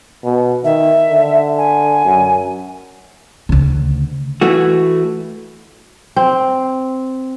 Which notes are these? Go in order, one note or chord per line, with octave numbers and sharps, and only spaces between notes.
B2
D#3 E5
D3
G#5
F#2
D2 C#3
E3 A3 F#4
C4